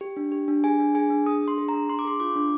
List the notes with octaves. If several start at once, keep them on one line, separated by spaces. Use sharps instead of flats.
G4
D4
G4
D4
G#4 G#5
D4
G#4 G#5
D4
G#4 D#6
D4
C6
G#4
D4 A#5
D4 C6
D6
G#4 C6
F4 D6
D4